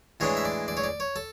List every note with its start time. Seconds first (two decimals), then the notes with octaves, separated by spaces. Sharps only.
0.20 A2 E3 G#3 D4 C#5
0.37 E5
0.45 D5
0.68 D5
0.77 C#5
0.84 D5
1.00 C#5
1.16 A4